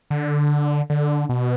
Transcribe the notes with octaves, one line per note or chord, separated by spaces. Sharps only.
D3
D3
B2